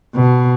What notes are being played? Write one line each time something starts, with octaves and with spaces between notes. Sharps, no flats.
B2